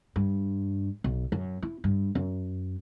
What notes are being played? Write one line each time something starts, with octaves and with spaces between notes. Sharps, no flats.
G2
B1
F#2
E4
G2
F#2